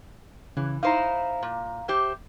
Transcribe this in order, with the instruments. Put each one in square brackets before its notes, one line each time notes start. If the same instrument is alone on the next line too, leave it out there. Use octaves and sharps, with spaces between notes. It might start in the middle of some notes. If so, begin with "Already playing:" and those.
[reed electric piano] C#3 [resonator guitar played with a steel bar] E3
[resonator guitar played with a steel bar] D#4 E4 C5 [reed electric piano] F5 A#5
[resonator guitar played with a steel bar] A#2
G4 C5 E5